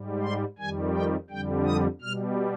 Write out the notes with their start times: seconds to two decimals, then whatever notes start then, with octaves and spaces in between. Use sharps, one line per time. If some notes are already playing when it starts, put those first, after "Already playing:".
Already playing: G#2 G3
0.23 C6
0.59 F2 D#3 G3 G#5
0.94 G5
1.30 F2 D3 G3 G5
1.66 D#6
2.01 B2 G3 F6